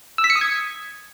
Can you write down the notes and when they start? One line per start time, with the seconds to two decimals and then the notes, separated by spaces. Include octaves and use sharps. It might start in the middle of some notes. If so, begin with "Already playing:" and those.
0.18 E6
0.24 B6
0.30 C#7
0.36 D#6
0.41 G#6